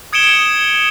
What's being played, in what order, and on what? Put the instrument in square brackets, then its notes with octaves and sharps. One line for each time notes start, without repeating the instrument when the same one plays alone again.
[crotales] D#6 G#6 C#7 D7 E7 G7